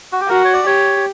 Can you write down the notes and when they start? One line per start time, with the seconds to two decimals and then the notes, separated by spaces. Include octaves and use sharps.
0.13 F#4
0.21 G4
0.29 F#4 A#4
0.44 C#5
0.54 D5
0.66 G4 C#5